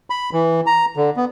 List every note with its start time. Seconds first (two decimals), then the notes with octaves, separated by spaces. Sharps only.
0.10 B5
0.33 E3
0.66 A#5
0.97 D3
1.17 B3